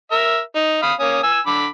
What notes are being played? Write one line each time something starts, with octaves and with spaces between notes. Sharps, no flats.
A#4 E5
D#4
F5 B5 D#6
A#3 C#4 D#6
G#5 E6
D3 B5 D6